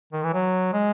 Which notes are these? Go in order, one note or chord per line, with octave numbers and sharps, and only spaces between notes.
D#3
E3
F#3
G#3